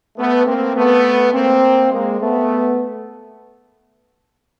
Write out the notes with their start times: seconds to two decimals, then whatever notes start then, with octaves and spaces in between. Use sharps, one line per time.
0.18 A3 B3
0.46 A#3 C4
0.76 A3 B3
1.33 A#3 C4
1.91 G#3 A#3
2.20 A3 B3